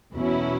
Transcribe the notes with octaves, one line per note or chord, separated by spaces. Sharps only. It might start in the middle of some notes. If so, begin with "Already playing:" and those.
E2 B2 F#3 C#4 E4